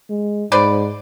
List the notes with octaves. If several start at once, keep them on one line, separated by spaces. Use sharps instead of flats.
G#3
G#2 B4 C5 D5